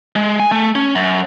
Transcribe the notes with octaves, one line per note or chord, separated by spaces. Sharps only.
G#3
G#5
A3
C#4
F#2